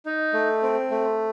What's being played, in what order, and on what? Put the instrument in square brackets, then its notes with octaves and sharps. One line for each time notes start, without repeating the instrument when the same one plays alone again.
[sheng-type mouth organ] D#4
A3
C4
A3